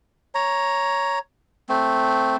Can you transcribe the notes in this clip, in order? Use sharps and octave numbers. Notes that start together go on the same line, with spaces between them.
C#5 A#5
A3 C4